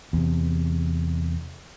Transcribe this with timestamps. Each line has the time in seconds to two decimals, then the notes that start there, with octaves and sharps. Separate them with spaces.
0.13 E2 C3